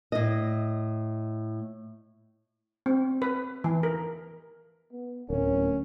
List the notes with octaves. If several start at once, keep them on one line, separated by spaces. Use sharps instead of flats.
A2 D#5
C4
B4
E3
A#4
B3
D1 C#4 A#4